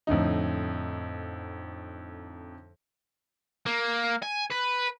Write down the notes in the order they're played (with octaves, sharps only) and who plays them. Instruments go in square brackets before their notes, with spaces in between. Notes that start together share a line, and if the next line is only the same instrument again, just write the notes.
[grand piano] F2 A2 D3 D#4
[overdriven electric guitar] A#3
G#5
B4